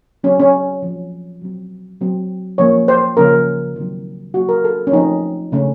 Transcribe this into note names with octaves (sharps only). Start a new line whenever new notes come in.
F#3 C4 C#4
C#4
F3 C4
F#3 C4
F#3 C4
F3 A#3 C#4 C#5
C5
C#3 F3 A#3 C#4 A#4
D#3 F#3 C4
F#3 A#3 C#4 F#4
A#4
A4
C#4
F3 A3 C4 D#4
C#3 A3 C#4